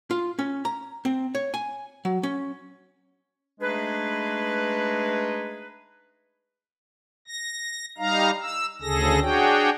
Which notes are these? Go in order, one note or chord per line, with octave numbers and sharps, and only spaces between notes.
F4
C#4
A#5
C4
C#5
G#5
F#3
C#4
G#3 A3 D4 D#4 G#4 B4
A#6
G3 D#4 F5 A#5
E6
D2 C#3 G#4 A4 A#6
D4 F#4 G#4 C#5 G5